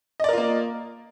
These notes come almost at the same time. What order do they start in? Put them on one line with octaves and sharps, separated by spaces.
D#5 D5 A#4 F4 A#3